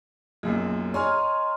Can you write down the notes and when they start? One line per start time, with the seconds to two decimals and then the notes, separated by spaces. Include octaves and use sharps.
0.43 B1 F#2 A#2 G#4
0.94 C#5 D#5 G#5 A#5 C6 F6